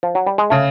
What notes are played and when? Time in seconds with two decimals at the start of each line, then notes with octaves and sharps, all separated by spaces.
0.03 F3
0.15 F#3
0.27 G3
0.38 G#3
0.50 C#3 A3